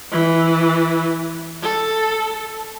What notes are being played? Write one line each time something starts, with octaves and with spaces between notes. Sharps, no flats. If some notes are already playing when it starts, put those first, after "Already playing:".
E3
A4